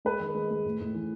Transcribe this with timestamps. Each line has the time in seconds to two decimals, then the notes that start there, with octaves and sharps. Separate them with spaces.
0.05 G#3 B4
0.20 D#3
0.35 G#3
0.51 G#3
0.65 A2
0.80 A2
0.94 E3